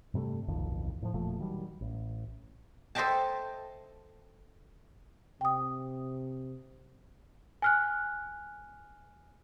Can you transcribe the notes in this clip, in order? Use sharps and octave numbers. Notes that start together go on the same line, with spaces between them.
G2 C3 G3 A3
D1 B1 F2 D#3
A2 F3
E1 A#2 F3 A3
D#3 F#3 G3
A1
A4 C5 D#5 E5 G5 A5
C3 G5 D#6
G#5 F6 F#6